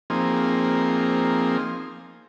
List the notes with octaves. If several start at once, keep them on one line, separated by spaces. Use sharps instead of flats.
F3 A#3 C4 D#4 G#4